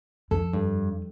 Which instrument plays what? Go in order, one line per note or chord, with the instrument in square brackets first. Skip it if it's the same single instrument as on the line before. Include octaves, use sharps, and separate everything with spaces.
[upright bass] F2 [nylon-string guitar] A4
[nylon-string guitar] G2